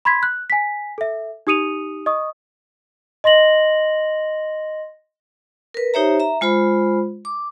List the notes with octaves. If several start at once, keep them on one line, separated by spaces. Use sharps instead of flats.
B5 C6 G#6 B6
F#6
G#5 B6
A4 E5
D#4 G4 D#6 C#7 D#7 F7
D#5 C#6 D#6
D#5 C6 A#6 F#7
A#4 B4
D#4 G4 C5 C#5 E5 A#5
E5 A#5
G#3 F4 C5 B5
D6